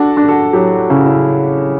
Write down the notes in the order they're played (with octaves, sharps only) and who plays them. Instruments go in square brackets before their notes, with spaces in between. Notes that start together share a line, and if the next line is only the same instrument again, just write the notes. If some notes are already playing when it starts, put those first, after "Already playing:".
Already playing: [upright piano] D4 [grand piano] F#4 A4
[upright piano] D4
[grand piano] F#4 A4
[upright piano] F#3 [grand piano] E4 G4
[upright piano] C#3 [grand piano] E4
[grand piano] F#4
C#4 E4